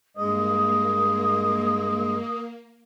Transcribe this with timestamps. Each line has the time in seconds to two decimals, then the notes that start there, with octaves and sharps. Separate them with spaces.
0.17 G2 G#3 A#3 D#5 D#6